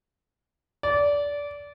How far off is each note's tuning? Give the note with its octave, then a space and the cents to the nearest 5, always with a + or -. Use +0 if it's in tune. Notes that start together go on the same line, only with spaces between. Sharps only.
D5 -20